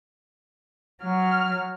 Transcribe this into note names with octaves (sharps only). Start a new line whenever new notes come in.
F#3 F6